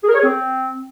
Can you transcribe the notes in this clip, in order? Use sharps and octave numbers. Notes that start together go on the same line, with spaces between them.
G#4
A#4
C#5
G#4
C4